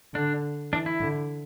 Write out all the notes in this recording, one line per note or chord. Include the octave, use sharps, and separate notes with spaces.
D3 D4
E3 D4
E4
D3